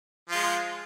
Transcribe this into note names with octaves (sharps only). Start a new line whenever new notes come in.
F3 G#3 F4